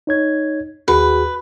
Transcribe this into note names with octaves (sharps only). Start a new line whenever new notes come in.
D#4 C#5 G#6
D#2 F#4 G#4 B4